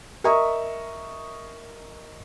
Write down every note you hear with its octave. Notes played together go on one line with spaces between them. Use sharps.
A#4 D#5 E5 A#5 C#6 D#6